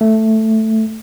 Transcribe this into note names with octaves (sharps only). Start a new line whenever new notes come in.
A3